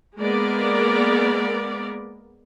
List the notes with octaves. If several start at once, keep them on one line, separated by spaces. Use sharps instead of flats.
G#3 A#3 B3 A#4 D5